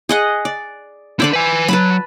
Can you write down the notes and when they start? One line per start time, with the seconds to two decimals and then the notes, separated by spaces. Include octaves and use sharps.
0.09 G#4 D#5 F#5
0.45 D5
1.20 D3 E4 C5 D5 B5
1.33 B4 G#5
1.68 F#3 B4 A5 B5